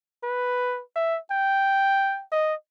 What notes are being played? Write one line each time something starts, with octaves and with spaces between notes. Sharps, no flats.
B4
E5
G5
D#5